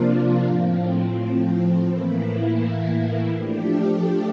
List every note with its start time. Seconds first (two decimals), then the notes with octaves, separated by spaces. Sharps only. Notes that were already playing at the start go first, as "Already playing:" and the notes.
Already playing: C3 F3 A#3 D4 F4
0.45 A2 F3 C4
1.88 A2 E3 A#3 E4
3.32 F3 A3 D4 G4